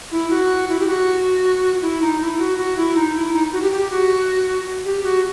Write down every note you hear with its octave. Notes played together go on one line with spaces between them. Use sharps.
E4
F#4
E4
G4
F#4
E4
D#4
E4
F#4
F#4
E4
D#4
E4
D#4
F#4
G4
G4
F#4
G4
F#4